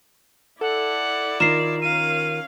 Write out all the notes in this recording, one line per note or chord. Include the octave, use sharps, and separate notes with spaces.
E4 A4 D5 F#5
D#3 F4 A#4 C7 E7
C#4 F5 D#7